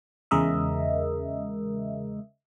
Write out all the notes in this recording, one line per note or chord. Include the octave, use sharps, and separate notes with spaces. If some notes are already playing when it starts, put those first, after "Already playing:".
E2 C#3 G#3 A#4 D#5 E5